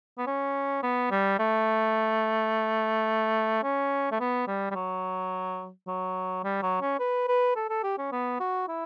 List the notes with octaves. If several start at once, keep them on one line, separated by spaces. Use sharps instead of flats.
B3
C#4
B3
G3
A3
C#4
A3
B3
G3
G3
F#3
F#3
G3
F#3
C#4
B4
B4
A4
A4
G4
C#4
B3
F#4
E4